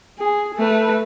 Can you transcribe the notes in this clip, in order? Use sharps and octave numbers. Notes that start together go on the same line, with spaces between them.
G#4
A3 B4